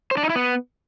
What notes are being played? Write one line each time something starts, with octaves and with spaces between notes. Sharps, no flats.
C5
D4
D#4
E4
B3